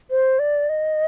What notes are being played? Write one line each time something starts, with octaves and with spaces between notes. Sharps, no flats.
C5
D5
D#5